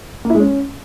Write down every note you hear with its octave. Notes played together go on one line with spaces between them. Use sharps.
A#3
E4
G#3
C#4